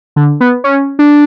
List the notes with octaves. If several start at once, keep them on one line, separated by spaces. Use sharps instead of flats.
D3
B3
C#4
D4